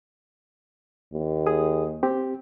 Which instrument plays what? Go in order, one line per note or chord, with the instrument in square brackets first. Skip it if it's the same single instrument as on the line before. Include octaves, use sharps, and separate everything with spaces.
[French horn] D#2
[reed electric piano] G#4 D#6
C4 G4